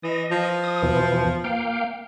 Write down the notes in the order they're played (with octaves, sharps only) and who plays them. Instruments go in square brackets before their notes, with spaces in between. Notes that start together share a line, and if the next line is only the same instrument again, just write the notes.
[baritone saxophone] E3 [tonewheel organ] D#5
[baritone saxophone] F3
[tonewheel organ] D#6
E2 B2 E3
A#3 F5 G5